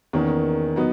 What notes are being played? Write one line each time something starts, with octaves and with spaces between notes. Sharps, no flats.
E2 D#3 A#3 C#4
F#3 B3 D#4